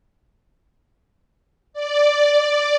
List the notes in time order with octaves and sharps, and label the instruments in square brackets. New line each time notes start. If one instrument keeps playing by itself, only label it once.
[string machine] D5